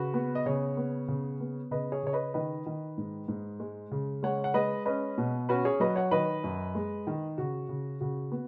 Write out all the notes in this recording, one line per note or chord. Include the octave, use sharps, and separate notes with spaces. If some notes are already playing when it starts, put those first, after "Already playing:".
Already playing: C#3 F#4 B4
B3
D#5
C#3 G#4 C#5
B3
C#3
B3
C#3 B4 D#5
G#4 C#5
C#3 C#5
B4 D#5
D#3 B4 D#5
D#3
G#2
G#2
G#3
C#3
G#3 C#5 F#5
F#5
G#3 B4 D#5
C#4 B4 D#5
B2
C#4 F#4 B4
G#4 C#5
F#3 B4 D#5
C#5 F#5
D#3 B4 D#5
F#2
G#3
D#3
C#3 F#4
C#3
C#3 F#4
B3